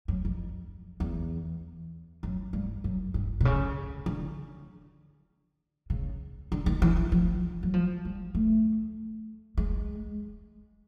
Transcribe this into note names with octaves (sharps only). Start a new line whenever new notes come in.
F#2
F2
E2
F#2
G2
F#2
G2
C3
C#3
D3
C#3
D3
D#3
E3
E3
F3
F#3
F3
G3
A3
G#3